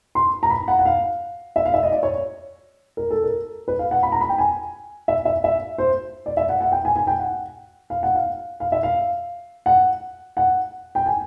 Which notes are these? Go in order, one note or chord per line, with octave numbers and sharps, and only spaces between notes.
C6
A#5
B5
F#5
F#5
F5
E5
F5
E5
D#5
D5
C#5
A#4
A4
A#4
B4
F5
F#5
B5
A#5
B5
G5
G#5
E5
E5
E5
C5
D5
E5
F#5
F#5
G5
G#5
G#5
G5
F#5
F5
F#5
F5
F5
E5
F5
F#5
F#5
G5
G#5